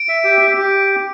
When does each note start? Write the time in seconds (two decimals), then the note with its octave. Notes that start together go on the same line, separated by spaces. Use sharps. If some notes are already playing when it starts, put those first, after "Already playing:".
Already playing: D7
0.09 E5
0.24 G4
0.41 G4
0.57 G4